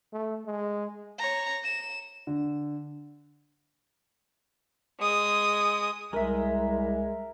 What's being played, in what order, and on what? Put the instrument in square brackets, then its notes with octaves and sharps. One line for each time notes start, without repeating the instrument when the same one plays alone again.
[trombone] A3
G#3
[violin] C#5 A#5
E7
[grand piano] D3
[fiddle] G#3 D#6
[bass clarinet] C2 [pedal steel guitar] G#3 [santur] A#4 E5